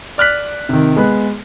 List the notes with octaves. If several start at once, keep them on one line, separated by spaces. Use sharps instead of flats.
D5 F6 F#6 B6
C3 D#3
G#3 B3 B4